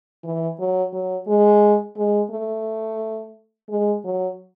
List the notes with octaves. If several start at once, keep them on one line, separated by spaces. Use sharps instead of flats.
E3
F#3
F#3
G#3
G#3
A3
G#3
F#3